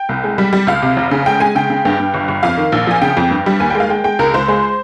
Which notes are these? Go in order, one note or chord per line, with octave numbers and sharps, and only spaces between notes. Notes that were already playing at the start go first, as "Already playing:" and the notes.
Already playing: G5
C2
G#3
G3
G3
C#2 F5
C3
F1
C#3
G#3 G5
G#3 G#5
C#3 G5
C#3
G2 G5
G2
G1
G1
F2 F5
D#3
A#1
F3 G#5
C#3 G5
F2
G2
G3
D#2 G#5
G5
G#3 F5
G#3 G5
G#3 G5
C#2 A#4
C#2 C5
G#3 C5